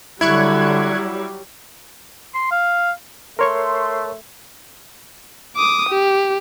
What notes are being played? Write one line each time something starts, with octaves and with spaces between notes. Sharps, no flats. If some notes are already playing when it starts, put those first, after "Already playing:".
D3 F#3 G3 E4 C#6 F#6 G#6
C6
F5
A3 A#4 C#5 C6 C#6
D6 D#6
G4